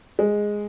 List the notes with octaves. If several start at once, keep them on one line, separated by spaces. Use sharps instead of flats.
G#3